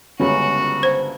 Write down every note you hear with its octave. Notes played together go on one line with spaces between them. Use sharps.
G1 C#2 C#4 F#4
C5